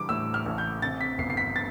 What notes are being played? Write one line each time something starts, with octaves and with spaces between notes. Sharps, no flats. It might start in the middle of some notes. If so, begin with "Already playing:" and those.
Already playing: E3 G3 D6
A2 E6
F6
A1
G6
C3 A6
B6
G1 C7
C7
B6
A6